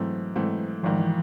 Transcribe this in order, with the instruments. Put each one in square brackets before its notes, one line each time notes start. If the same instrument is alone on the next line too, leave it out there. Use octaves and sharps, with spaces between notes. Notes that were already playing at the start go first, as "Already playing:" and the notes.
Already playing: [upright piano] G#2 E3 A3 C4 [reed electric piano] F#3
[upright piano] G#2 E3 A3 C4
[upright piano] G#1 G#2 D#3 [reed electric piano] F3
[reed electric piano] E3